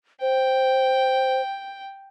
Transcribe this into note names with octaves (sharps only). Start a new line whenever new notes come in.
C5 G5